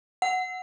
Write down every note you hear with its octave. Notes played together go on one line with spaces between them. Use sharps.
F#5